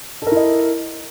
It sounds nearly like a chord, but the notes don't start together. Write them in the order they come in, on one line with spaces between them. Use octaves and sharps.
A4 A#4 E4 D#5